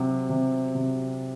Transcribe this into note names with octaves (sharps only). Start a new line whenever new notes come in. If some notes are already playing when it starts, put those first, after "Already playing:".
Already playing: C3 F#3
C3
C3